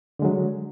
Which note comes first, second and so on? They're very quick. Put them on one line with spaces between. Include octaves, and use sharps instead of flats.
D3 G#3 F#3